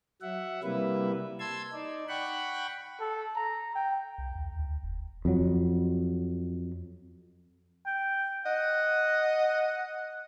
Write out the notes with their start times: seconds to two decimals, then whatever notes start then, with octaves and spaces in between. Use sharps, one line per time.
0.22 F#3 E5 F#5
0.63 C3 G3 A#3 E4 B4 E5
1.40 A5 C6 E6 G#6
1.73 D#4 D5
2.09 F#5 G5 B5 C#6 F#6
3.00 A4
3.36 A#5
3.75 G5
4.18 C2
4.35 D#2
4.59 D2
4.83 E1
5.25 F2 F#3
7.86 G5
8.46 D#5 F#5